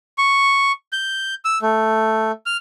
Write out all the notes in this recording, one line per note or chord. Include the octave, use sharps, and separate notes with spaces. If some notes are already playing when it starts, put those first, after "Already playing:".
C#6
G6
E6
A3
F6